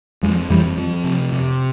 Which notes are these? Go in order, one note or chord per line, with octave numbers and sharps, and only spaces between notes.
F2 F3 G#3
F2 E3 G3
F2 F3
C3
C3